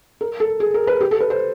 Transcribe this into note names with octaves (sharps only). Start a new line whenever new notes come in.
A#4
A4
G#4
A#4
B4
G4
A4
B4
C5